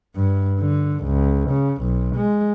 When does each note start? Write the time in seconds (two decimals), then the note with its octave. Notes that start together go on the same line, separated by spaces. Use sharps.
0.16 G2
0.60 D3
1.04 C#2
1.50 C#3
1.82 B1
2.16 G#3